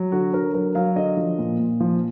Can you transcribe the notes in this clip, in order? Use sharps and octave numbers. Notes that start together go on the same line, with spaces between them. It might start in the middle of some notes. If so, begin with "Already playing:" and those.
Already playing: F#3
D3 F#4
D3 A#4
F#3 A#4
F#3 F5
D3 D#5
F3
A#2
A#2
F3